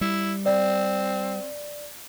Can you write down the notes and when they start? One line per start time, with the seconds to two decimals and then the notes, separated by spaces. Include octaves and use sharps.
0.01 G3 E4
0.46 C4 D5